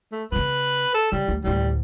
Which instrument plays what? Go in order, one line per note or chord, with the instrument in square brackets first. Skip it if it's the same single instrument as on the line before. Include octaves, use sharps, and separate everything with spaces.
[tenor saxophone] A3
[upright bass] C#3 B3 [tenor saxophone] B4
[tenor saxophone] A4
[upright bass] C#3 [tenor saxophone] G3
[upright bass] D2
[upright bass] D2 A2 [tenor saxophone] G3